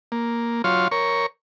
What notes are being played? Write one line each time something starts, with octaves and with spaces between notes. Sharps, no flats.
A#3
F#3 F4 C#5 F5 C6
A#4 C#5 C#6